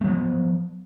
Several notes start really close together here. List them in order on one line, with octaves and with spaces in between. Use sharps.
A3 F3 F#3 B3